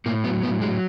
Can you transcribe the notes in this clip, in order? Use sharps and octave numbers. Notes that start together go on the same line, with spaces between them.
A2 A#3
F#3 B3
A2 B3
F#3 G#3